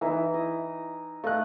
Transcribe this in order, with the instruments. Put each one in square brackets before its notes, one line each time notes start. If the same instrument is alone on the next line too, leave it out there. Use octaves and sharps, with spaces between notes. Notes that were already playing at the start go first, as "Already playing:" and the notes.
[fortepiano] E3 [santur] D#4 E4
[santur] D#5
[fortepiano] A3 F#6 [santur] D#5 F5